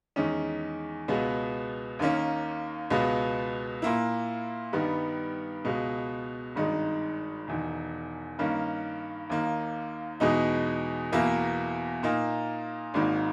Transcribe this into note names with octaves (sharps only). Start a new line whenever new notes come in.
E2 D#3 G#3 C#4
C#2 B2 G#3 B3
D#2 D#3 A#3 C#4
C#2 B2 G#3 B3
A#2 A#3 E4
G2 D#3 G3 B3
C#2 B2 G#3
G#1 G2 D#3 G#3 D#4
E1 E2 D#3
G2 D#3 A#3 C#4
D#2 D#3 A#3
E2 B2 G#3 D#4
E2 B2 A#3 E4
A#2 A#3 D#4
G#1 G#2 D#3 A#3